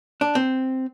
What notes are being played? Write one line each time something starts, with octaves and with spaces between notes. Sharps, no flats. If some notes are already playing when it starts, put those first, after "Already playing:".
D4
C4